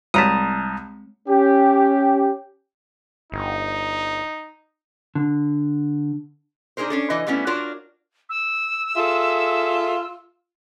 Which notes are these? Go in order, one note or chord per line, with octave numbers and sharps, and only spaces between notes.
C2 G#3 C4 C#5 A5 A#5 D#6
C#4 G4
G1 D#4
D3
D4 D#4 G#4 A#4 C5
C#4 D4 A4
E3 D#5
G3 A3 B3 C#4 E4
D4 F4 F#4 A#4 C#5
E6
F4 G#4 A4 E5